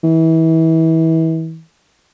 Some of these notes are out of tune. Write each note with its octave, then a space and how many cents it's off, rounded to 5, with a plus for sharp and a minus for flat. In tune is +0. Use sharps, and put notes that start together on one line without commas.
E3 -30